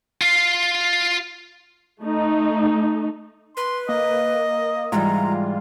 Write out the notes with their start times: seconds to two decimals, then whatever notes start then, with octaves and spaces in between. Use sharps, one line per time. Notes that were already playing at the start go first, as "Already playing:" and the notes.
0.21 F4 F5
2.01 A3 D#4
3.57 B4 C6
3.89 A#3 D#5
4.92 G#2 E3 G3 F4 A#5